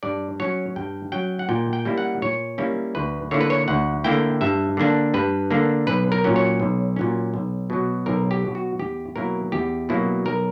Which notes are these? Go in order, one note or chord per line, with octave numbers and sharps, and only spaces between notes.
G2 D5
F#3 C#4 C#5
G2 G5
F#3 C#4 G5
F#5
A#2 G5
G5
G3 A#3 C#4 E4
F#5
A#2 C#5
G3 A#3 C#4 E4
D2 B4
D3 A#3 E4 C#5
B4
C#5
D2 F#5
D3 A#3 E4 G5
G2 E5
D3 A#3 D4
G2 B4
D3 A#3 D4
B1 B4
A#4
A#2 F#3 C#4
C#5
B1
A#2 F#3 C#4
B1
B2 F#3
B1 A#4
G4
B2 F#3
F#4
E2 G4
B2 F#3 A#3 E4 A#4
E2 G4
B2 F#3 A#3 E4
B1 A#4